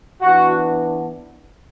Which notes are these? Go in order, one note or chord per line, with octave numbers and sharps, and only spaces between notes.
E3 B3 D4 F#4